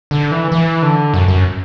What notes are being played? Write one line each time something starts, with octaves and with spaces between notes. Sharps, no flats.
D3
E3
E3
D3
F#2
F#2